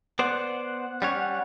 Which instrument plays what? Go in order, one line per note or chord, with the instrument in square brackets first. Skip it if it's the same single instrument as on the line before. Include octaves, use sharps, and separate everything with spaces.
[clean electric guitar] B3 C5 D5 [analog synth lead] F#5
[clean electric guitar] G3 C#4 C#5